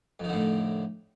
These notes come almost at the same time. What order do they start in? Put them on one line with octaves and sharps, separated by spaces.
F2 D#3 D3 A2